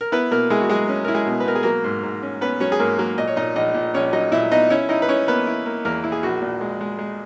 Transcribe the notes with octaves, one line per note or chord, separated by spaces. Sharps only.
A#4
B3 E4 B4
B2 A#3 A#4
G#3 E4 G#4
F#4
F#3 G#3 G#4
C#4
E4 A#4
G#3 G#4
B2
B4
B2 A#4
G#4
F#3 A#3 A#4
G#2
G#2
C#4
B3 C#4 B4
F#3 C#4 C#5
G#4
G#2 A#3 A#4
F#3 A#3 A#4
A#2 D#5
C#5
A#2 D#4 D#5
A#1 D#4 D#5
A#2
A#1 C#4 C#5
F#3 D#4 D#5
A#2 E4 E5
B3 D#4 D#5
C#4 E4 C#5
D#4 E4 D#5
B4
C#4 E4 C#5
A#3 B3 B4
E4
A#3
E2 A#3 A#4
E4
G#4
A#1 F#4
A#2
G#3
G#3
G#3